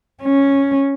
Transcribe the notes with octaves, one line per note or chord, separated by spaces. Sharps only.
C#4